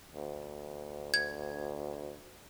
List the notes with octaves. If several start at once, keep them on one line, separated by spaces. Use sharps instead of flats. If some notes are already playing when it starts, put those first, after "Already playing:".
D2
G#6